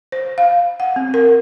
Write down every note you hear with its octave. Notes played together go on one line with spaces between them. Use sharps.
C5
F5
F#5
C4
A#4